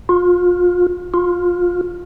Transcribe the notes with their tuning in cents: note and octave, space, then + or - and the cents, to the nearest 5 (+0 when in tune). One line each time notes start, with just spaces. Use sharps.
F4 +30
F4 +20